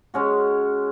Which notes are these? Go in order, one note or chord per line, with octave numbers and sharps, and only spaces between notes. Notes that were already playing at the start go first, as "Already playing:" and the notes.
G#3 C#4 F#4